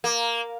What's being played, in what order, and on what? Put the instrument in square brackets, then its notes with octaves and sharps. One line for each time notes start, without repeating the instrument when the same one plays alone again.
[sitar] A#3